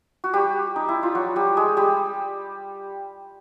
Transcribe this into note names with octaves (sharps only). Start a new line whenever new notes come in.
F#4
G3 G4
D#4
E4
F4
F#3 F#4
G3 G4
G#3 G#4
G3 G4